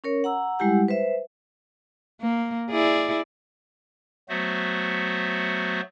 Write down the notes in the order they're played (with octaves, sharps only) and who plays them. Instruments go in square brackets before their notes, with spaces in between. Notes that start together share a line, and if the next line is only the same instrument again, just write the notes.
[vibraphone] C#4 A#4 C#5
F#5 A#5 E6
G3 G#3 E4 G4 F#5
B4 C5 E5
[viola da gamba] A#3
E4 G#4 D5
[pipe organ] F#3 A3 B3 F#4 C5 E5